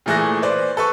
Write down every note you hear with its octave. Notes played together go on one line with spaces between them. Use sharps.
A#2 E3 A3 G#4 F#6 A#6
B4 C5 D5
A4 B4 C#6